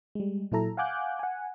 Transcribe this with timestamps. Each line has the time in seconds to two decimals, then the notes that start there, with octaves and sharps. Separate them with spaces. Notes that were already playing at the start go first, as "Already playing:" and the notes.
0.15 G3 G#3
0.52 A#2 F#3 E4 A4 A#5
0.77 F5 F#5 G#5 D6 F#6 G6
1.19 F#5 G#5